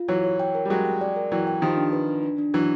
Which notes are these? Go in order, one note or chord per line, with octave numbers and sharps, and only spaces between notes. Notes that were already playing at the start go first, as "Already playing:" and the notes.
Already playing: F4
E3 F#3 C#5
C#5
G5
A#4
G3
F#3 G#3 G5
G5
D5
A#4
E3 F#3 G5
G5
D#3 F3 G4
D4
B4
D4
D4
D4
E3 F#3 D4